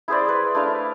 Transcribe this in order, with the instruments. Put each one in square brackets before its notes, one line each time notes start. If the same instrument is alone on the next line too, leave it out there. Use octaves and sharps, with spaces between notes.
[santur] E4 G#4 C5 D5
B4 C6
A3 D4 E4 F5